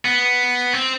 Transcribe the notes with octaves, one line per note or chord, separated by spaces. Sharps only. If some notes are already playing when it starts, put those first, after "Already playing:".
B3
C4